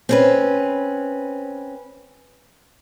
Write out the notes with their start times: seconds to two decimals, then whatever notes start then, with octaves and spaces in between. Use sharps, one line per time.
0.09 C4 C#4 B4